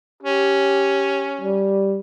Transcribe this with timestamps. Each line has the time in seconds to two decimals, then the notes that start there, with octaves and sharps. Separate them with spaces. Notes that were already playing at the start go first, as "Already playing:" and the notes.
0.23 C#4 G4
1.41 G3